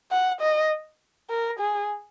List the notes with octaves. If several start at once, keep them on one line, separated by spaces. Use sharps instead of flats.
F#5
D#5
A#4
G#4